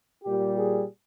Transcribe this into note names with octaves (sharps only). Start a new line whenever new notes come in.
A#2 G3 G4
G#4